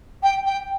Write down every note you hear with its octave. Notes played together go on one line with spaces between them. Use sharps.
G5
G5